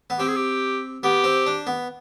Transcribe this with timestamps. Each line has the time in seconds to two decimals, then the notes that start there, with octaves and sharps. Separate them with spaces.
0.10 B3
0.19 C4 G4
0.28 G#4
0.36 G4
1.03 B3 G4
1.24 C4
1.46 D4
1.67 B3